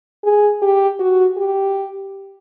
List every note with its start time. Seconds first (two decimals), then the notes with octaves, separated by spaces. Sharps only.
0.24 G#4
0.62 G4
1.00 F#4
1.37 G4